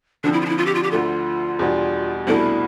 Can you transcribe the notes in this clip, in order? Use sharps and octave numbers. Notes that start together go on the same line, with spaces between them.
D3 F3 C4 D4
E4
F4
D4
E4
F4
G4
F4
G4
D2 D3 A3 F4
E2 B2 G3 D4
C2 B2 A3 D4 E4 A4